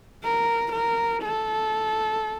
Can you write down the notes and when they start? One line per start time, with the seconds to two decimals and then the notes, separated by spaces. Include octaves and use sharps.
0.24 A#4
0.72 A#4
1.22 A4